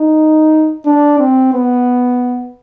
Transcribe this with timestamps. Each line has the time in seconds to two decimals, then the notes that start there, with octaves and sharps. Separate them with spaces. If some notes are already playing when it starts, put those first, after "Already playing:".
Already playing: D#4
0.85 D4
1.19 C4
1.53 B3